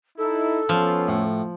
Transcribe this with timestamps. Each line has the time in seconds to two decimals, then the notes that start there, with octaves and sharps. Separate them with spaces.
0.18 D#4 E4 A4
0.69 F3 B3 C#4 F4
1.08 A2